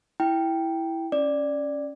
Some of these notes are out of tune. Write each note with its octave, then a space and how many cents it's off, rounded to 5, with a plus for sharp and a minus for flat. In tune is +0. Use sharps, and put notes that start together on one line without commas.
E4 +0 G5 +0
C#4 +0 D5 +0